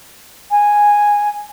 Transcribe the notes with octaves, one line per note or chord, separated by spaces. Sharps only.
G#5